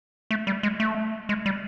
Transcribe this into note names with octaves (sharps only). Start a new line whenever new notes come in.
A3
G3
G#3
A3
G#3
G3